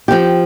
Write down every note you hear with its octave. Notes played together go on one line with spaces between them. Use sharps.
F3 C4 G4